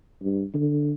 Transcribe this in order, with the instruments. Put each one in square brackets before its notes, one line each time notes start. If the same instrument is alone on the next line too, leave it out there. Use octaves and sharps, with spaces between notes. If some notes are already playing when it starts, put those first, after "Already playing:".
[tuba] G2
D3